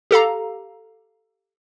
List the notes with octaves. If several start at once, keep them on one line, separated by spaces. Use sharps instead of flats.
G4 A4 F5 A#5